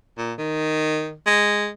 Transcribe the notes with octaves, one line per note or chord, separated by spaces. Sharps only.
A#2
D#3
G#3